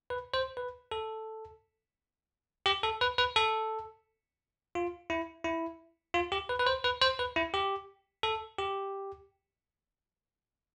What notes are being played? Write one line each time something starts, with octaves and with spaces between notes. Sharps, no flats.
B4
C5
B4
A4
G4
A4
B4
B4
A4
F4
E4
E4
F4
G4
B4
B4
C5
B4
C5
B4
E4
G4
A4
G4